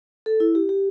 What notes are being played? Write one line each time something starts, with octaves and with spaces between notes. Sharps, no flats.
A4
E4
G4
G4